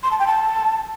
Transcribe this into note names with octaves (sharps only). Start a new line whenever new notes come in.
C6
A5
G5
A5